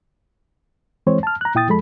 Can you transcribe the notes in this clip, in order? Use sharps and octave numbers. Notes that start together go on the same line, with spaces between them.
E3 G#3 C4 C5 C#5
A5 F6
A#5 F#6
A#2 E4 G5 D#6 A6
F2 F3 G#3 A4 B5